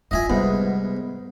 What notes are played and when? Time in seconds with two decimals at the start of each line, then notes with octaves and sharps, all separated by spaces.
0.11 E4 F4 D#5 E5 G#5
0.29 C2 G#2 G3 B3